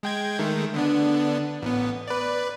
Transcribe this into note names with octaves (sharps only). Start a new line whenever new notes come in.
G#3 G5 G#6
D#3 G#3 A3
D3 B3 D4
A1 B3
B4 D5